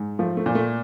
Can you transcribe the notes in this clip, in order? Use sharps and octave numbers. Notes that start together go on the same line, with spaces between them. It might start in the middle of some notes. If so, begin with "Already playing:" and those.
Already playing: G#2
F3 A3
A3
A#2
A3